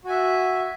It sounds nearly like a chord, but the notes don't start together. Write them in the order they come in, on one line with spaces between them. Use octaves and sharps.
F#4 G#5 E5